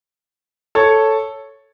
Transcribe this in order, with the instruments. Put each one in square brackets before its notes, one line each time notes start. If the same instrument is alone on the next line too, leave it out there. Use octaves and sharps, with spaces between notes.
[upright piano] A4 C#5